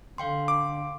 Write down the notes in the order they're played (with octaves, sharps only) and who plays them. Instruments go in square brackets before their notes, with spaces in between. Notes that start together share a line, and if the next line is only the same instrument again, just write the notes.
[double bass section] D3 [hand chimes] F5 G5 C6
[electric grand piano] D6